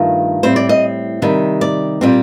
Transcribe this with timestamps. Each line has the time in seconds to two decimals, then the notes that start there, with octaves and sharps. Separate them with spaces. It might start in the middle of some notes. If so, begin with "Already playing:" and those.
Already playing: G2 D#3 A3 F4
0.43 A2 G3 C4 C5
0.56 D5
0.69 D#5
1.22 C3 D#3 G3
1.61 D5
2.01 A#2 G3 C4